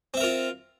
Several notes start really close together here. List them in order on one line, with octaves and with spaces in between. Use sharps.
C4 E5 A#4 F4